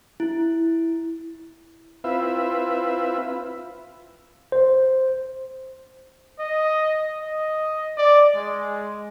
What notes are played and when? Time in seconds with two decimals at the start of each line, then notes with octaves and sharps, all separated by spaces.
0.20 E4
2.04 C4 E4 F4 B4 E5
4.52 C5
6.39 D#5
7.20 D#5
7.97 D5
8.35 G#3